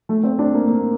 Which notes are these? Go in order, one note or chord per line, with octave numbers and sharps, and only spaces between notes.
A3
C4
D4
A#3
A#3